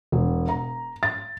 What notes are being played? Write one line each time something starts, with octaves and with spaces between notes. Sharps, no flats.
E1
A#5
A6